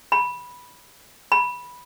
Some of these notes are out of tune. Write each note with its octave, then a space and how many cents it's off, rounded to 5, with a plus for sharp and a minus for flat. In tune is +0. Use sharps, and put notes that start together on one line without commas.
B5 -10
B5 -10